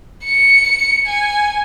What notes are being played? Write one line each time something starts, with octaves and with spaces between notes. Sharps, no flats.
C#7
G#5